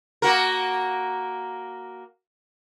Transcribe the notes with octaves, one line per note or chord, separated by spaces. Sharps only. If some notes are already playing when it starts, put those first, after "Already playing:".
A#3 F#4 A#4